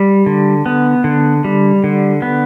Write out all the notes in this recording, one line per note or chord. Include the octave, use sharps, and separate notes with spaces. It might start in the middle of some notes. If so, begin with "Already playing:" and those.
Already playing: G3
D3
B3
D3
G3
D3
B3